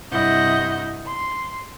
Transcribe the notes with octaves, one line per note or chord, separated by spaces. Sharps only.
G2 C3 E4 D#5 F#5 G6
C6